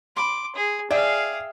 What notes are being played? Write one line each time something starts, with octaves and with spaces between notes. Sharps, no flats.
B5 C6 D6
G#4
G#4 D5 E5 F5 G5 G#5